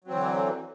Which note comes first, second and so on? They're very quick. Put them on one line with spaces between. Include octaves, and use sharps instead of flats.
F#3 C4 E3 D3